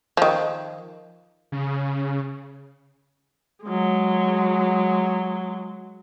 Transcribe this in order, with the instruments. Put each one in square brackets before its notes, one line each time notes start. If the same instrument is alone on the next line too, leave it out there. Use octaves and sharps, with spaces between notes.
[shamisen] D#3 F3
[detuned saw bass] C#3
[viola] F#3 G#3